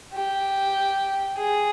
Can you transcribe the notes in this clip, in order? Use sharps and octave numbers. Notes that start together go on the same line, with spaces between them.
G4
G#4